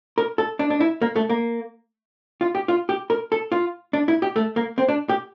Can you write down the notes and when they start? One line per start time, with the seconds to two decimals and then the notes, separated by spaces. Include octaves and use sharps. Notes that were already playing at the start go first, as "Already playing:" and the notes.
0.18 A#4
0.38 A4
0.59 D4
0.70 D4
0.80 E4
1.02 A#3
1.16 A3
1.29 A#3
2.41 F4
2.55 G4
2.68 F4
2.89 G4
3.10 A#4
3.32 A4
3.52 F4
3.93 D4
4.08 E4
4.22 G4
4.36 A3
4.56 A#3
4.78 C4
4.88 D4
5.09 G4